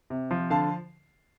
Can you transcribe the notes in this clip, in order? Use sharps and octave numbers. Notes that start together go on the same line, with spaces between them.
C3
F3
D3 F5 A5